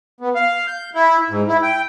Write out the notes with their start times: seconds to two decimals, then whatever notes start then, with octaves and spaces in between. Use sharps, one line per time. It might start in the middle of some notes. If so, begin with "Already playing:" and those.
0.21 B3
0.35 F5
0.68 G6
0.95 E4
1.30 G#2
1.48 E4
1.63 G5